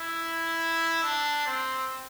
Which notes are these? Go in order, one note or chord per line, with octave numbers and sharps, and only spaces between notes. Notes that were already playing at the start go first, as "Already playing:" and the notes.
Already playing: E4
D4
C4